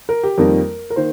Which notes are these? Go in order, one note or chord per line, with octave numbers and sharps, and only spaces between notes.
A#4
G4
F2 D#3 G3 A#3 A#4
A#4
D#3 A#3 C5